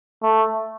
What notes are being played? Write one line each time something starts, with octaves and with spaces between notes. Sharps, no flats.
A3